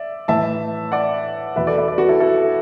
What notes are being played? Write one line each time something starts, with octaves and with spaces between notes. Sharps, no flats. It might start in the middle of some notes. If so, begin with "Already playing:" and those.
Already playing: D5 E5
A2 E3 E5 A5
D5 F#5
E2 B2 B4 E5
A4 D5
B4 E5
A4 D5
F#4 B4
E4 A4
E4 A4